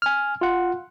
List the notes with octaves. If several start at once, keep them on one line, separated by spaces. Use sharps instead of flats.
G#5 F6
F4 F#5